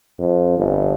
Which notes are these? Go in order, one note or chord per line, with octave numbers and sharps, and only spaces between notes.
F2
G1